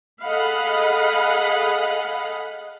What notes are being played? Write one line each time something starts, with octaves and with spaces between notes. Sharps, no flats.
G#4 A4 D#5 F5 F#5 B5